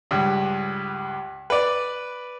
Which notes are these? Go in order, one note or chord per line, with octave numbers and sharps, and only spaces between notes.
C#2 G2
B4 D5